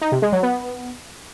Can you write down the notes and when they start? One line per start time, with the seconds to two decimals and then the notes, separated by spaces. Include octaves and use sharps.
0.02 D#4
0.12 C3
0.22 G#3
0.32 F#3
0.43 B3